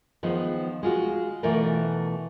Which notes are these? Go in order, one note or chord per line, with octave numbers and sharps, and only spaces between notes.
D#3 F3 G#3 B3
G#3 F4 F#4
B2 E3 A3 F4 A#4 D5